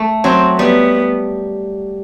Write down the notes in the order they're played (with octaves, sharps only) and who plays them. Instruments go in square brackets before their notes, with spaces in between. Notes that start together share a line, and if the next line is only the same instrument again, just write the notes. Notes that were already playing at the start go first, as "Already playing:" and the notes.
Already playing: [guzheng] A3
[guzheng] F#3 [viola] C4
[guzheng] G3 [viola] B3